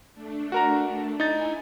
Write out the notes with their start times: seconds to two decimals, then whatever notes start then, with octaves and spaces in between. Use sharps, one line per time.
0.14 A3 D4
0.52 F#4 A#4 A#5
1.20 D#4 E4 G#5 A6